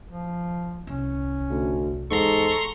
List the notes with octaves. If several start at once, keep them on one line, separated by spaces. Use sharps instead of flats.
F3
C2 C#4
D2
E2 G#2 A4 A#5 C6 C#6